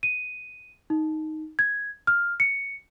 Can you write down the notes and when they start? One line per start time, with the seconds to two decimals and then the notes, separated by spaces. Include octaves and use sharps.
0.03 D#7
0.90 D#4
1.59 G#6
2.07 F6
2.40 C#7